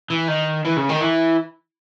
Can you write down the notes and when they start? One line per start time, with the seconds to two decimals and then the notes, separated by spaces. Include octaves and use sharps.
0.10 E3
0.28 D#3
0.65 E3
0.77 C#3
0.89 D#3
1.01 E3